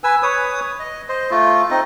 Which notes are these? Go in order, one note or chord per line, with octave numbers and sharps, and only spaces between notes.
B4 G#5 E6
B4 C#5 D#6
D#5
C5 D#5
A3 F4
C4 D#4 D#5